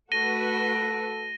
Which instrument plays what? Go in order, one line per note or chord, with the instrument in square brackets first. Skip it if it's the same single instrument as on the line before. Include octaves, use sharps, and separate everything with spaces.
[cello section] A3 F#4 B4 [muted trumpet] A4 [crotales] A#6 D#7 G7